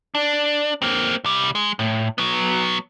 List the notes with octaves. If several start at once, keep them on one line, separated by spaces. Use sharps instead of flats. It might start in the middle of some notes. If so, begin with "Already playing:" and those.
D4
A#3 C4
C2 G3
G#3
A2
F#3 B3